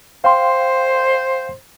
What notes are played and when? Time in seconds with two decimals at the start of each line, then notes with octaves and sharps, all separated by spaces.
0.24 C5 F5 G5 C6